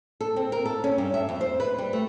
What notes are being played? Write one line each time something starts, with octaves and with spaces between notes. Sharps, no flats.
A4
C4
A#4
A4
C#4
G2
E5
F2
C5
B4
G3
A3